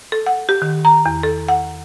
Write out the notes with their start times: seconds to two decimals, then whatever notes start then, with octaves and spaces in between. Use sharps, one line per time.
0.12 A4
0.26 F#5
0.49 G4
0.62 D#3
0.85 A#5
1.06 E2
1.23 A4
1.49 F#5